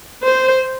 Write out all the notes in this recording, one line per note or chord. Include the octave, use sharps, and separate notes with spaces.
C5